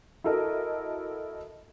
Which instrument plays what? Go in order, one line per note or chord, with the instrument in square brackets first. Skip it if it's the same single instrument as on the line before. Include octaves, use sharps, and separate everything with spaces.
[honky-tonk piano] E4 F#4 A4 A#4 D#5